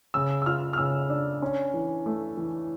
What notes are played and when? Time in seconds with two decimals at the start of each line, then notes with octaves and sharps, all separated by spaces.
0.14 C#3 E6
0.42 E6
0.46 F4 F6
0.73 F6
0.78 C#3 E6
1.09 D4
1.42 C#4
1.74 E3
2.06 A3
2.37 E3